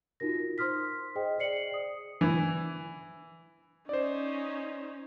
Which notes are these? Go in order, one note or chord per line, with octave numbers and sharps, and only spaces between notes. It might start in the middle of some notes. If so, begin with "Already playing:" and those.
D#4 F4 F#4 A#4 A#6
C5 C6 D#6 F6 B6
G#4 C5 D#5 G5
G#4 C5 D5 C7 C#7 F#7
D5 D#6
E3
C#4 D#4 C5 D5